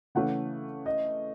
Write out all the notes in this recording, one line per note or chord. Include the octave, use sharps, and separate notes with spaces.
C#3 E3 A3 C#4 F#5
D#5